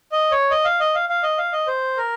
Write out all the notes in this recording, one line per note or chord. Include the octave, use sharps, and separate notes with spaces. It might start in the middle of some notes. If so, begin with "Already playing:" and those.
D#5
C#5
D#5
F5
D#5
F5
F5
D#5
F5
D#5
C5
A#4